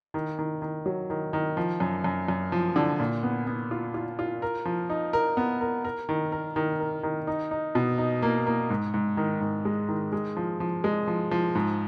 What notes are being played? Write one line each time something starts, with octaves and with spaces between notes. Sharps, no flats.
D#3
D#3
D#3
F#3
D#3
D#3
F3
F#2
F#2
F#2
F3
D3
A#2
B3
B3
F4
F4
F4
A#4
F3
D#4
A#4
B3
A#4
A#4
D#3
A#4
D#3
A#4
D#3
D#4
D#4
B2
D#4
A#3
A#3
G#2
G#2
D#3
G#2
G#3
D#3
G#3
F3
F3
G#3
F3
F3
G#2